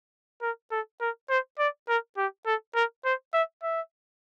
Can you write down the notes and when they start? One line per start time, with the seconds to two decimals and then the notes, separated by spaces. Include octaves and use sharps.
0.42 A#4
0.72 A4
1.01 A#4
1.30 C5
1.59 D5
1.88 A#4
2.17 G4
2.46 A4
2.75 A#4
3.05 C5
3.34 E5
3.63 E5